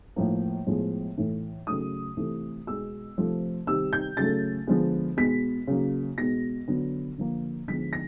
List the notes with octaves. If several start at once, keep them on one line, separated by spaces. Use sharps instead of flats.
A2 F3 A#3
A2 F3 G#3 B3
A2 E3 A3
C#3 F#3 A3 D#6
C3 E3 A3
B2 G#3 B3 E6
C3 F3 A3
C3 D#3 G3 E6
G6
C#3 F#3 A3 A6
D3 F3 G#3 B3
B2 G#3 B3 B6
C#3 F#3 A#3
B2 G#3 B3 A#6
D3 F#3 B3
D3 F3 A#3
D3 F3 G#3 B3 B6
A#6